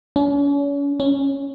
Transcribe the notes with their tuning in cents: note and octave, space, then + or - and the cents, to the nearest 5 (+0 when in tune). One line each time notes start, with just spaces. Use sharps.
C#4 +40
C#4 -5